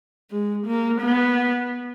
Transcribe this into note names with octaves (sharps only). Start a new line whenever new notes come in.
G#3
A#3
B3